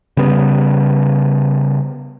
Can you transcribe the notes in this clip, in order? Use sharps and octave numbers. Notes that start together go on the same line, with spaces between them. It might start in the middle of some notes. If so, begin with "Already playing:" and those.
C#3 G3 B3